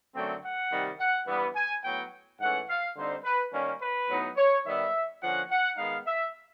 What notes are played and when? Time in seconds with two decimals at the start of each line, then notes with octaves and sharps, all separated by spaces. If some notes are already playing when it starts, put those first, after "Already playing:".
0.14 F#2 D3 F#3 A3 C4 G5
0.43 F#5
0.71 C3 D#3 G3
0.99 F#5
1.27 G2 E3 G3 B3
1.55 G#5
1.83 A2 F#3 B3 G5
2.39 G#2 E3 A3 C#4 F#5
2.68 F5
2.96 D3 G3 C4 D#4 C5
3.24 B4
3.52 D#3 G3 A#3 C#4
3.81 B4
4.08 A2 F#3 B3 D#4
4.36 C#5
4.65 D#3 G3 B3 E5
5.21 D3 F3 A#3 C#4 F#5
5.50 F#5
5.78 D#3 G#3 B3 D#4 F5
6.06 E5